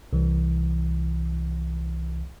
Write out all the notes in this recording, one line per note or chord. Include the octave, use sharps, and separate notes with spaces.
C2 E3